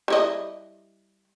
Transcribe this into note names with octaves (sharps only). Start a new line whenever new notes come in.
G3 E4 D#5